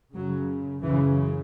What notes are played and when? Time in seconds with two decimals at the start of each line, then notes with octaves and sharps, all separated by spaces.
0.14 F#2 C#3 F#3
0.82 F#2 C#3 E3